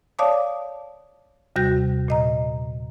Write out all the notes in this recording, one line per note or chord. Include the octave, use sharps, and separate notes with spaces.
C#5 D5 F5 A5 D6 D#6
D#2 C3 G3 F#4 G6 A#6
A#2 D#5 A#5